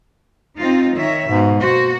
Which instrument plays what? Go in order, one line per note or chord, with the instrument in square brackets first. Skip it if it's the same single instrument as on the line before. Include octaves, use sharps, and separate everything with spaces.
[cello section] C4 D#4 F4
D#3 C#5 E5
[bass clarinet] G#2 [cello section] B2 G#3
[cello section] A#3 F#4 [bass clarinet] C5